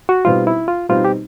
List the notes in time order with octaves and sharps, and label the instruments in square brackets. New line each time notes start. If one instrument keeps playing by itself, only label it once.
[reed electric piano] F#4
[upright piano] B2 G3 C4 D#4 [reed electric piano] F4
[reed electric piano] E4
F4
[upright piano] B2 G3 C4 D#4 [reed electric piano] F4
[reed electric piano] G4